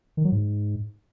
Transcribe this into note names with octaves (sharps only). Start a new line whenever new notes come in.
D#3
F#3
G#2